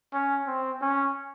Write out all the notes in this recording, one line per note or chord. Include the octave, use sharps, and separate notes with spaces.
C#4
C4
C#4